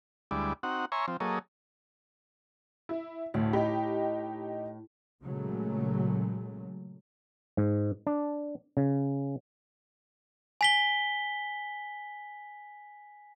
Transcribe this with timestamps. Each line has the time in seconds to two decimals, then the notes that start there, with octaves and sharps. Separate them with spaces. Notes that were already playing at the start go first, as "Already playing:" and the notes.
0.31 D2 G3 G#3 E4 D5
0.63 C4 D#4 F#4 F#5
0.92 C#5 E5 G#5 A#5 C6 C#6
1.08 F3 C4
1.20 F#3 A#3 G#4 A4 C#5 D#5
2.89 E4
3.34 D2 A2
3.53 D#4 G4 B5
5.25 A#2 C#3 F#3 G#3 A3
7.57 G#2
8.07 D4
8.77 C#3
10.61 G#5 B6 G7